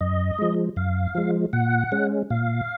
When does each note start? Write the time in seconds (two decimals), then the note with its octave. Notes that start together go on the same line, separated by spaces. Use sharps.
0.01 F#2 D#5
0.39 F3 G#3
0.76 F#2 F5
1.15 F3 G#3
1.53 A#2 F#5
1.92 G#3 C#4
2.30 A#2 F5